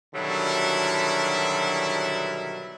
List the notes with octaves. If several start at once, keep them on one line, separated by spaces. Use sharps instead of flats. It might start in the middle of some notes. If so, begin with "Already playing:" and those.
B2 D3 D#3 F#3 G3 E4